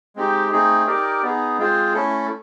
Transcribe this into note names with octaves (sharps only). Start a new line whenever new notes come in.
G#3 C4 D#4 G4
A3 C4 D#4 G#4
D#4 G4 A#4 D5
B3 D#4 G#4
G#3 C4 F4 G#4 C5
A3 C#4 E4 A4